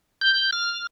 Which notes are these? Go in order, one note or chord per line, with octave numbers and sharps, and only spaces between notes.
G6
F6